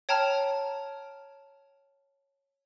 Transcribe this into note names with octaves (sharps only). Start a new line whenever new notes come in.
C#5 G5 A5 A#5 F6